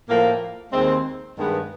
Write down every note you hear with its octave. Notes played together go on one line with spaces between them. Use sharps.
A2 F3 A#3
D#2 D#3 G#3 C4
G2 D#3 G#3 B3